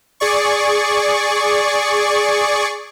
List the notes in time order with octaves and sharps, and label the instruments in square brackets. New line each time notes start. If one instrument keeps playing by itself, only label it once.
[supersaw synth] G#4 D5 C#6